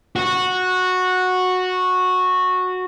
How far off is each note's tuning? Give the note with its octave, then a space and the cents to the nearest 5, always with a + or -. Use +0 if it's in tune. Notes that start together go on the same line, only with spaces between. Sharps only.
F#4 -10